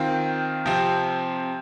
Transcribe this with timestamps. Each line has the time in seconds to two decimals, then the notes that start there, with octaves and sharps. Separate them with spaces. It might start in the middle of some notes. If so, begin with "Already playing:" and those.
Already playing: D#3 C4 F4
0.66 C3 F3 C4